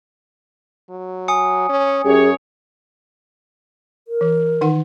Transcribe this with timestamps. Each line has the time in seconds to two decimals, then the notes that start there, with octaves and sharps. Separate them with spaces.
0.90 F#3
1.28 G#5 D#6 C#7
1.69 C#4
2.05 F#2 G4 G#4 C#5
4.08 A#4
4.21 E3
4.61 D#3 D#4 F#5